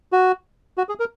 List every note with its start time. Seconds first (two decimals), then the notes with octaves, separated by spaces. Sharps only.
0.12 F#4
0.78 F#4
0.89 G#4
1.00 A#4